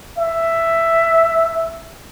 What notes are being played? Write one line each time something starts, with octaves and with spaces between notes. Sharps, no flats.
E5